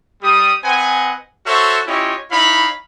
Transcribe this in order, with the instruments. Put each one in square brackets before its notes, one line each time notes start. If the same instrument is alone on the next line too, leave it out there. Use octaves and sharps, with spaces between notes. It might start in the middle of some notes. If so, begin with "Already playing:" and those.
[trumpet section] G3 D#6
C4 B4 D#5 F#5 G#5
F#4 A4 C5 C#5 E5 F#5
C#4 E4 F4 G4 C#5 D#5
D#4 E4 C#5 F5 B5